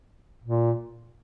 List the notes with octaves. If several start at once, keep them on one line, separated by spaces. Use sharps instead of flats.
A#2